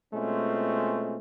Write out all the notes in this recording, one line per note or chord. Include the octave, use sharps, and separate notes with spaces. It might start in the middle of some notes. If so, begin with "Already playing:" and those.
B2 G#3 A3 C4 C#4 F4